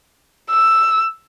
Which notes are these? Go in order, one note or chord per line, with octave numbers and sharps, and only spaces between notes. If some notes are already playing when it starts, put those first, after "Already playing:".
E6